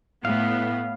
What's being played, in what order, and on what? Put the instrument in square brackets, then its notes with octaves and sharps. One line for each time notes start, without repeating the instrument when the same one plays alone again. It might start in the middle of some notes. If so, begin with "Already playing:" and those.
[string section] A2 B3 [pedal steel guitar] F5